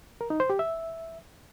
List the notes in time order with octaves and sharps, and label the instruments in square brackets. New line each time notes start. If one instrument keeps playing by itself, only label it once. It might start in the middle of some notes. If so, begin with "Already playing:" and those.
[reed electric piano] A#4
D#4
C5
G4
E5